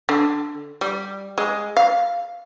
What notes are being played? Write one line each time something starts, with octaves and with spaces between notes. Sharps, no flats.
D3
G3
G#3
F5